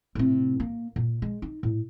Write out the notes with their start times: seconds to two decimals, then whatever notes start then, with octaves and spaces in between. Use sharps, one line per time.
0.15 A2 C3
0.60 A#3
0.96 A#2
1.22 G#3
1.42 D#4
1.63 A2